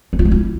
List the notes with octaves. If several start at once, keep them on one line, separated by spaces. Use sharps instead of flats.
C#4
F4
G#3
E4